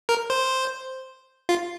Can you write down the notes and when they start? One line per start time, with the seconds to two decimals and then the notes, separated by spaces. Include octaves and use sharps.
0.09 A#4
0.30 C5
1.49 F4